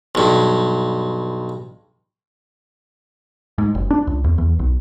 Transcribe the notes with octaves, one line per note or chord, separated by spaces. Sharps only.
B1 G2
G#2
F#1
D4
C#2
E2
E2
B1